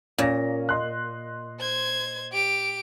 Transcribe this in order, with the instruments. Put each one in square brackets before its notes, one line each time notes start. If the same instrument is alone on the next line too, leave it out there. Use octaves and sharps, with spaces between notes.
[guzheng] A#2 [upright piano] C#4 A#6
[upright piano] D#5 C6 F#6
[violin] C5 G#6
G4 D7